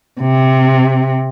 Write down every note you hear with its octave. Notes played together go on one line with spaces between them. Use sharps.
C3